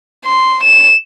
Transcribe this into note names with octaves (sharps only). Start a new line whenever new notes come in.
C6
E7